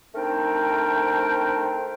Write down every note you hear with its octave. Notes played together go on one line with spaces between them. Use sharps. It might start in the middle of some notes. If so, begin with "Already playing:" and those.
A3 C4 D4 D#4 A#4 G5